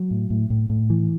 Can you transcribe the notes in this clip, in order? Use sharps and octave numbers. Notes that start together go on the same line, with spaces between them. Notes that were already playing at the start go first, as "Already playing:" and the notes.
Already playing: F#3
A2
A2
A2
A2
E3